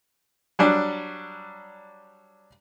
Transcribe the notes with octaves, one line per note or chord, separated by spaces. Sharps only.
F#3 G3 D4